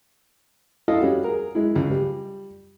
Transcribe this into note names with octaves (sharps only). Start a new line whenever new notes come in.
E4 F4 A4 D#5 F5
G3 C#4 F#4
G#4 A#4
G#3 E4
C#2
G3